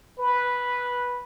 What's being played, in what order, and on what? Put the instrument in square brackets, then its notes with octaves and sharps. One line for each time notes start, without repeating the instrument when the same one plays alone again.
[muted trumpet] B4